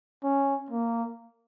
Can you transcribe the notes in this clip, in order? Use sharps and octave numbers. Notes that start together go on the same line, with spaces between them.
C#4
A#3